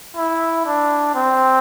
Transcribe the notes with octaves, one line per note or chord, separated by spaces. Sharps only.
E4
D4
C4